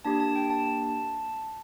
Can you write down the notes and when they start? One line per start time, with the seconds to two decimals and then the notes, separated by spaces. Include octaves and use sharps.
0.05 A#3 D4 G4 A5
0.20 A5
0.36 G5
0.50 A5